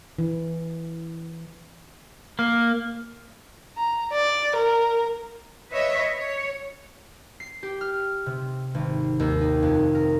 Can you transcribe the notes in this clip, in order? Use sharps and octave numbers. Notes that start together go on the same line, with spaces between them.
E3
A#3
A#5
D5
A#4
B4 C#5 D#5 E5
C#5
C7
G4
F6
C3
G#1
D#2
D#4
F2
A#4